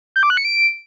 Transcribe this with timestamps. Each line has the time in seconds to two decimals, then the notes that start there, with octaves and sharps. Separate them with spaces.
0.16 G6
0.23 D6
0.30 F#6
0.37 C#7
0.45 D7